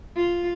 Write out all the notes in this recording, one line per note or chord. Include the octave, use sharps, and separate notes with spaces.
F4